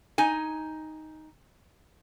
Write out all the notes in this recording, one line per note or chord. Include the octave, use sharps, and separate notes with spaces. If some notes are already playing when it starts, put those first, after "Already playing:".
D#4 G#5